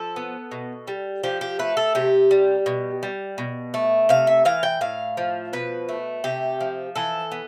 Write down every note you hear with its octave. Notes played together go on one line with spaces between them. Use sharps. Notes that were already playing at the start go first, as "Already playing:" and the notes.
Already playing: F3 A4
B3
B2
G3
F3 G4
G4
A3 B4
A4
C3 G4
G3
B2
G3
B2
A3
C3 F5
E5
E3 F5
G5
A2 F5
F3
B2 B4
A3
C3 G4
F3
E3 A4
B3